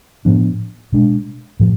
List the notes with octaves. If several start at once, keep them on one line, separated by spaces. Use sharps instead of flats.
A2 F3 B3 D4
B2 G#3 D4
A2 F3